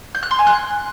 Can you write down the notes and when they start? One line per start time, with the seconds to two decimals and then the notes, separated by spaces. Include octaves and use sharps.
0.15 G6
0.23 F#6
0.31 C6
0.39 G#5
0.47 F#6